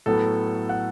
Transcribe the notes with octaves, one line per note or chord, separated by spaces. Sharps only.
A2 F#3 B3 A4
F#5